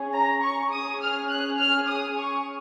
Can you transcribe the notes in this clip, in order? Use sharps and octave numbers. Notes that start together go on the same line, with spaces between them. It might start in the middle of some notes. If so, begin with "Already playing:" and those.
Already playing: C#4 G#4
A#5
C#6
C#4 G#4 D#6
F6
F#6
F6
D#6
C#6